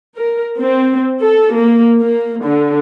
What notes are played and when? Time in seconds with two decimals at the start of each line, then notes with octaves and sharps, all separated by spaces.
0.14 A#4
0.58 C4
1.21 A4
1.54 A#3
2.00 A#3
2.42 D3